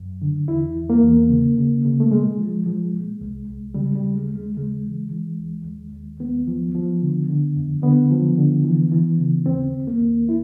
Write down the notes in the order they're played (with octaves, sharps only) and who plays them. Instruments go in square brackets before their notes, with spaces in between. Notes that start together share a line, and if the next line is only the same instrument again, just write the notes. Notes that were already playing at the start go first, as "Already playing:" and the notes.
Already playing: [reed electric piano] F#2
D3
E2 E4
E2
A#3
E2
C#3
C#3
C#3
A3
A#2 G#3
F3
F3
A#2
C2
C2
C#3 G3
G3
D#2
G#3
D#2
G#3
C#3 G#3
E3
E3
D#2
D#2
D#2
D#2 B3
F3
F3
D3
D3
F2
D3 B3
F3
D3
E3
E3
C#3
D#2 C4
D#2
A#3
D#2
E4